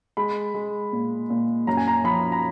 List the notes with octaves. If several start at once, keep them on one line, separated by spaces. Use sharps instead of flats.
G#3 B5
G#3
A#2
A#2
F#2 A#5
G#5
A#5
F3 B5
A#5